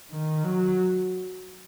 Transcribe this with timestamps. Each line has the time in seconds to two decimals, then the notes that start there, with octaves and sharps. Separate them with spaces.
0.12 D#3
0.44 F#3